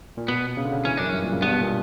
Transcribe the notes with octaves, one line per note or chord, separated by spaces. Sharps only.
A#2
B2 B3
C#3
D3
C#3
E3 C#4
F#2 D4
G2 C#4
A#2
C#3
G2 B3
B2
A#2